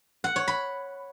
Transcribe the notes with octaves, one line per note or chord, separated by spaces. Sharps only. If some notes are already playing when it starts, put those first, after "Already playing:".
F#5
C#5
B5